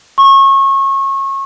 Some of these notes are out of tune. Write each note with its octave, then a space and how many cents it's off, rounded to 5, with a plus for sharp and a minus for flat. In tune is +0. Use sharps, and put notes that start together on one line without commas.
C#6 -25